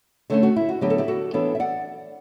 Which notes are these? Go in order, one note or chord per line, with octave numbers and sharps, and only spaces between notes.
D3 A3 C#4 A4 C#5
F#4
E4
F#4
D3 F#3 B3 D4 G4
A4
E4 G4
F#4 A4
E3 B3 D4 A4 C#5
E5
D5 F#5